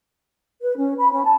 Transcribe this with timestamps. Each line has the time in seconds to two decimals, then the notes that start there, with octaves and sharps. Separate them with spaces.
0.62 B4
0.77 C#4
0.98 B5
1.12 C#4
1.24 A5